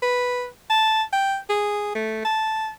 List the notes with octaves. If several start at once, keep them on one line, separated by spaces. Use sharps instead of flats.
B4
A5
G5
G#4
A3
A5